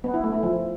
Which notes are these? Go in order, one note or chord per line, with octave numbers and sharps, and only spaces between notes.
B3
E4
A3
E4
F3